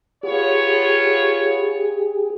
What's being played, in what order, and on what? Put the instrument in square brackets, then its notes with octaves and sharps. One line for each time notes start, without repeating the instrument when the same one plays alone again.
[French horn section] B3 F4 C#5 [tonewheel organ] G4 G#4